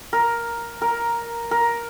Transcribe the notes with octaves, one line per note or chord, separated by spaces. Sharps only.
A#4
A#4
A#4